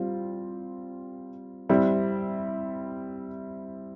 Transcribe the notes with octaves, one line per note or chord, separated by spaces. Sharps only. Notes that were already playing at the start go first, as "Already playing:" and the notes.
Already playing: G3 C4 F4
G3 C4 E4